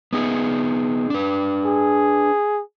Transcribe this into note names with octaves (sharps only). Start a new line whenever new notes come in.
B3 D#4 G#4
D4 B4
G#4